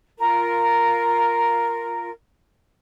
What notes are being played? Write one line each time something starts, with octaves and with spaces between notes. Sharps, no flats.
F4 A#4